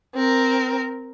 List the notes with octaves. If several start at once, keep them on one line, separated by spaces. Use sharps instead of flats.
C4 A#4